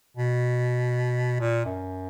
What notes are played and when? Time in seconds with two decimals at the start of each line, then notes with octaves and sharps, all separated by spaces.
0.17 B2
1.40 A#2
1.65 F#2